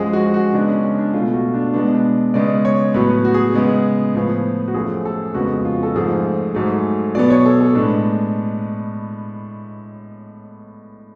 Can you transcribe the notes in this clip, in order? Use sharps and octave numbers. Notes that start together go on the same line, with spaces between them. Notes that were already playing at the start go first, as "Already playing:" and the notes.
Already playing: F#2 F3 G#3 G#4
F#4
F#4
C#3 G#3 B3 D4
C#4
C#4
D4
B2 A3 F4
F#4
D4
B2 G#3 B3 D4
D4
C#3 G#3 B3 D5
C#5
A2 F#3 B3 B4
F#4
G#4
C#3 G#3 B3
A2 F3 B3
F#4
F#2 F3 A3 G#4
A4
F2 C#3 G#3 B3 F#4
F4
A4
G#2 F3 A3 G#4
G#2 F#3 A3
B2 F#3 B3 D5
C#5
A4
A4
A2 G#3 B3 D4